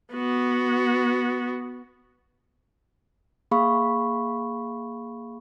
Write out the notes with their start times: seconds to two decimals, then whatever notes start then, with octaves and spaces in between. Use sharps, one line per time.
0.14 B3 F#4
3.51 A#3 G#4 F5 B5 C#6